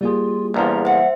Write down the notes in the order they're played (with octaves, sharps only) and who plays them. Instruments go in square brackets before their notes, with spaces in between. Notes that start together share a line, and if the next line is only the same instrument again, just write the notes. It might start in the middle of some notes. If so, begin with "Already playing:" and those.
[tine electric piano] G3 A#3 G#4 [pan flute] F4
[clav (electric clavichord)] A#1 E2 F3 [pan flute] A#5
[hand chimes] C5 E5 [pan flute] F#5